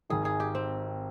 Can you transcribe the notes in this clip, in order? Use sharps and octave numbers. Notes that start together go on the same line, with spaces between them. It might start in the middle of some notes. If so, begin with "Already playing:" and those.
G#1 G#2 D#3 G#4
G#4
G4
C4